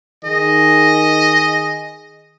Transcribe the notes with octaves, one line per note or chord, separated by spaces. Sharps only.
D#3 G#4 D#5